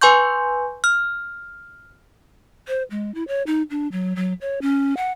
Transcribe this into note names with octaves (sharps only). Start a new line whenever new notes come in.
B4 G#5 C6 C#6 G6
F6
C5
G#3
E4
C#5
D#4
D4
F#3
F#3
C#5
C#4
F#5